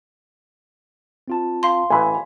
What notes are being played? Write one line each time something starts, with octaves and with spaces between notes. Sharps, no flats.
C4 F4 A5
F5 C6
A1 E3 B4 G#5 B5